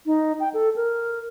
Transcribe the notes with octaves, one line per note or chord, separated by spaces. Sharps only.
D#4
G5
A4
A#4